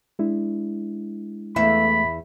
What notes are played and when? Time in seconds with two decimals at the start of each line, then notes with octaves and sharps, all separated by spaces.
0.19 G#3 D4 E4
1.56 E2 A3 E5 B5